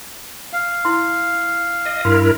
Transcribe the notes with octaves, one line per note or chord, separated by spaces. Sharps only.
F5
E4 C6
D#5
G2 E4 A#4 C6